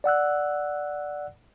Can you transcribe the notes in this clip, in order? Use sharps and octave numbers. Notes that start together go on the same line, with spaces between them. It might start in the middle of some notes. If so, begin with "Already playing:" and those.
D5 F#5 E6 F#6